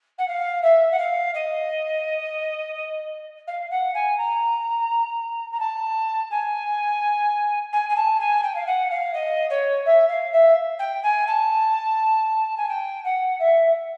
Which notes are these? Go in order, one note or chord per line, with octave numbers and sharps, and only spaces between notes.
F#5
F5
E5
F#5
F5
D#5
F5
F#5
G#5
A#5
A#5
A5
G#5
G#5
G#5
A5
G#5
G5
F5
F#5
F5
D#5
C#5
E5
F5
E5
G5
G#5
A5
G#5
G5
F#5
E5